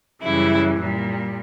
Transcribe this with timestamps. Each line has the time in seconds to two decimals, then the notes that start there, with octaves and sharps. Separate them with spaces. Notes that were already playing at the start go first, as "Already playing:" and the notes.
0.22 F#2 C#3 E3 G3 E4
0.78 A#2 G3